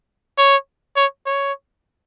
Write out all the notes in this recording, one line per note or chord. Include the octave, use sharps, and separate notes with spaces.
C#5
C#5
C#5